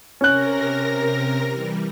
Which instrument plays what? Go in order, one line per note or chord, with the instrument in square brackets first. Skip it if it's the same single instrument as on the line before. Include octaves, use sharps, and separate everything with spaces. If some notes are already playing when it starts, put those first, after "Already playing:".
[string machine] C3 A#4 A#6 [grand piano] C#4 F#6
[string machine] E3 G3